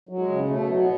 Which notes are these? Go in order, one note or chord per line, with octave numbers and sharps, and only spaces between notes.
F#3
G#3
C#3
B2 A3
F#3
B3